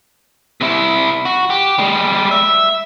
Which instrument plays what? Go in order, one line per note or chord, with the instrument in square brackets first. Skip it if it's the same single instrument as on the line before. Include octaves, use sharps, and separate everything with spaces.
[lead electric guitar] C3 E4
F#4
G4
G3 G#3
E5